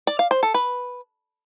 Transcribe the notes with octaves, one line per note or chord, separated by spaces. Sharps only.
D5
F5
C5
A4
B4